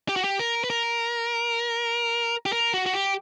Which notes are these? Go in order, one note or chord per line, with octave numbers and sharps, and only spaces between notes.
G4
F#4
G4
A#4
B4
A#4
G4
A#4
F#4
F#4
G4